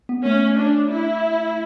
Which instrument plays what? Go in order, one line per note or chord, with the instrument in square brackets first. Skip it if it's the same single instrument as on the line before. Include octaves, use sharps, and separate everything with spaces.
[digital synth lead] B3
[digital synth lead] A3 [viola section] C#4
[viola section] D4
E4